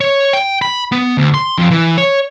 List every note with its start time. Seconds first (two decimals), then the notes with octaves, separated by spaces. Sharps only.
0.01 C#5
0.33 G5
0.62 B5
0.92 B3
1.18 D2
1.34 C6
1.58 F2
1.71 E3
1.98 C#5